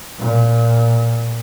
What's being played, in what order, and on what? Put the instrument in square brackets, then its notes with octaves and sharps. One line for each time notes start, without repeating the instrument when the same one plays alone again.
[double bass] A#2